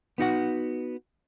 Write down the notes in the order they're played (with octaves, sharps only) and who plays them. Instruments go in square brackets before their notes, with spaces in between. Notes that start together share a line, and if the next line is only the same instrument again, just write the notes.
[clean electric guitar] B3 D#4 F#4 F#5